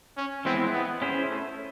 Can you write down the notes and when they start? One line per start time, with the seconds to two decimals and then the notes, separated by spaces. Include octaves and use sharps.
0.17 C#4
0.45 E3 G#3 B3 C4 E4
0.73 B3
1.02 C#4 E4 G#4 C5
1.30 A3